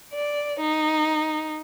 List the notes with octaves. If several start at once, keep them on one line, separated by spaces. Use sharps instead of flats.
D5
D#4